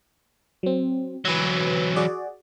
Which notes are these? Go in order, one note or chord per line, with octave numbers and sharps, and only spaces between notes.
F#3 C4
E3 F#3 B4 E6
F#4 G#4 D5